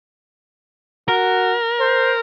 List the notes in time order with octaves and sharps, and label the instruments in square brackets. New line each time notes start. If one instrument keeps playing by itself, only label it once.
[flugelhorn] F#4 [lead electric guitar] A#4
[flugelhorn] C5